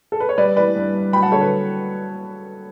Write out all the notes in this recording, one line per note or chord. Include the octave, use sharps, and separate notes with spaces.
A4
B4
C#5
G3 B4 D5
E3 B4 D5
G2
G2
F#3 G5 B5
F#5 A5
D3 A4 C#5
B4